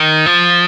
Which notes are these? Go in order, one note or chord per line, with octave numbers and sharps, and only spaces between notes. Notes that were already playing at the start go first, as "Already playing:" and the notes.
Already playing: D#3
F3